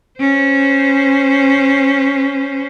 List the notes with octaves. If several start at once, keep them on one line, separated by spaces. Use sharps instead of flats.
C#4 C5